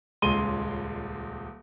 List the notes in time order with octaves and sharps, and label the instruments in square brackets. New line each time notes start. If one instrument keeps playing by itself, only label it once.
[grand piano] D#1 C#2 G#3 C6 D#7 G7